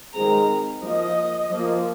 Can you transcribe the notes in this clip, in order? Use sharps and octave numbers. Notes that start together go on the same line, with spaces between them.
D#3 G#3 C4 A#5
F3 A#3 D#5
F3 A#3